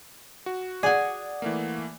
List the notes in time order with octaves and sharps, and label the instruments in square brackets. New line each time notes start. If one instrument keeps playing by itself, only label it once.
[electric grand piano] F#4
[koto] G#4 G#5 [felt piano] D5 F#5
[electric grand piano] E3 A3 A#3